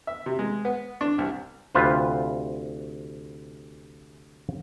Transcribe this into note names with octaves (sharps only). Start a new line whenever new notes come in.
E5
C3
G#3
B3
D4
C2
D2 C3 F4 B4 C5